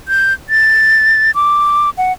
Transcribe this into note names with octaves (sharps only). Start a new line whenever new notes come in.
G6
A6
D6
F#5